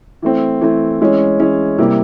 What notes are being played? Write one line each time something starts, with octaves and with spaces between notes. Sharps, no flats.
E3 A3 C4
E3 A3 C4
E3 G#3 C#4
E3 G#3 C#4
C3 E3 G3 A#3